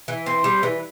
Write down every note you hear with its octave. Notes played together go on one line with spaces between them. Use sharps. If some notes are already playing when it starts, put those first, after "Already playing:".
E3
C4
G3
E3